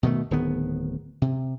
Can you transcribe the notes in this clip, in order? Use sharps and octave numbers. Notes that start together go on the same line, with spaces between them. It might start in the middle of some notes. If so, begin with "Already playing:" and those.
B2 D#3 F3 A3
D1 D#3 B3
C3